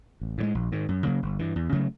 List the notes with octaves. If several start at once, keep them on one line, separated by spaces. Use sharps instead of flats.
A1
A2 F3 G#3
A#1
G#2 D#3
F#2
C#3 F#3 A#3
G1
G2 E3
E2
C#3 F#3 A3